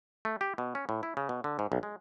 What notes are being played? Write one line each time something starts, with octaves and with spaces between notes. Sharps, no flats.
A3
G4
B2
C#4
A2
E4
C#3
B2
D3
G#2
B1
G#3